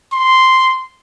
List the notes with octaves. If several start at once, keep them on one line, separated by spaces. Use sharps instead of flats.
C6